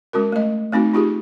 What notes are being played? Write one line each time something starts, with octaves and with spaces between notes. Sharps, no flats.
G#3 C#4 F#4 A#4
A3 D#5
A3 C4 D#4 F#4
D#4 F4 G4 G#4